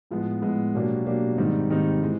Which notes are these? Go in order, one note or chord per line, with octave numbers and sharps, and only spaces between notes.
A2 F3 G#3 B3
A2 F3 G#3 B3
B2 F#3 A#3 D4 G4
B2 F#3 A#3 D4 G4
G#2 D#3 G3 C4 D#4
G#2 D#3 G3 C4 D#4
E3 G#3